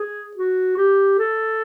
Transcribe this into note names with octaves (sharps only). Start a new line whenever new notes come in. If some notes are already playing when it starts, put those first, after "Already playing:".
Already playing: G#4
F#4
G4
A4